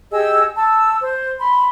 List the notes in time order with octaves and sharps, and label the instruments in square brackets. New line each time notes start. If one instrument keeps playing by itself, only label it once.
[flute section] G4 G#4 D#5 E6
A5 E6
C5
B5 C6